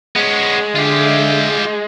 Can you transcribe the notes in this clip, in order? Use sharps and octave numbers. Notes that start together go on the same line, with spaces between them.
G#3 B3 C#4
D3 F4 G4 E5